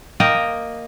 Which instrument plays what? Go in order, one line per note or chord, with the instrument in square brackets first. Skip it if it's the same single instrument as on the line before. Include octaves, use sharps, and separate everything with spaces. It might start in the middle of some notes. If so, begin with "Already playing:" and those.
[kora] A#3 D#5 G5